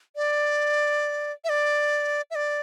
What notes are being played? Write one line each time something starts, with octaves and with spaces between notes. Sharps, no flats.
D5
E5
D5
E5
D5